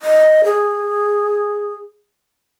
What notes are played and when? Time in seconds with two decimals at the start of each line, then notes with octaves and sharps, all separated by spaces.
0.02 D#5
0.44 G#4